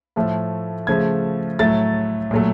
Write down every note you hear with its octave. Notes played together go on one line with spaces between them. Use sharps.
A2 F3 A3
C#3 F3 A3 G#6
A2 F#3 A3 A6
A#2 F#3 A3